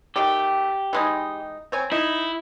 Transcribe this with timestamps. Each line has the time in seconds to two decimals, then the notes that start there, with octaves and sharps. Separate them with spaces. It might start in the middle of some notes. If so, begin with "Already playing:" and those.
0.16 D#3 A3 G4 D5
0.93 E3 G#3 D#4
1.72 C4 C#5 G#5
1.92 D#4 E4